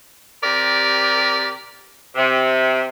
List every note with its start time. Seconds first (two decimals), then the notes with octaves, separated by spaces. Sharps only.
0.43 C3 G4 A#4 D5
2.15 C3